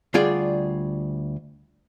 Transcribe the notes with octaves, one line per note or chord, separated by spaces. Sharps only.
D2 G3 F4 G#4 D5